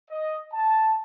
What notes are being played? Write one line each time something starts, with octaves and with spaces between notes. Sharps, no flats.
D#5
A5